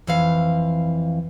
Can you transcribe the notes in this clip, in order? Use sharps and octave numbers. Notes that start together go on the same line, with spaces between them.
F2 E3 F5